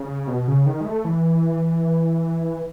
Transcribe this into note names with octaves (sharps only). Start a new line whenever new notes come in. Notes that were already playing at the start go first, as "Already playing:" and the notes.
Already playing: C#3
B2
C#3
D#3
G#3
A3
E3